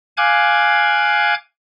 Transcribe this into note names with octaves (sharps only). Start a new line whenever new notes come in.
F5 G#5 D6 F#6 G#6